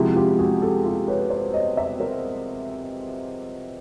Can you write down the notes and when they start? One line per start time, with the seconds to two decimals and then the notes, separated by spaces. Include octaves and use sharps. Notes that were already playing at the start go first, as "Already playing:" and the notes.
Already playing: C3 F3 G#3 E4 F#4
0.16 F4 G4
0.39 F#4 G#4
0.62 G4 A4
0.85 F4 G4
1.08 B4 C#5
1.30 C5 D5
1.54 C#5 D#5
1.77 D5 E5
2.00 A#4 C5